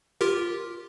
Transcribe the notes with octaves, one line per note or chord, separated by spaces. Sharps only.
F4 G4 A#4